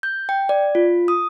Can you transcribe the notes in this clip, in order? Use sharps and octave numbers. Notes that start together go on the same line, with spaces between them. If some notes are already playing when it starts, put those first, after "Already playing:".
G6
G5
D5
F4
D#6